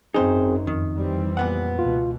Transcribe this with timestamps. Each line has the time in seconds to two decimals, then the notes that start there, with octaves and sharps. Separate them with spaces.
0.14 G#1 F#2 C4 D#4 G#4 C5
0.67 F2 D#3
0.98 E3 G3 C4
1.37 A#2 B3 F#5
1.79 C#2 B2 E3 F4